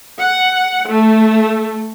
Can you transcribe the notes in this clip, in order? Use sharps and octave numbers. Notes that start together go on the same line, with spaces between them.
F#5
A3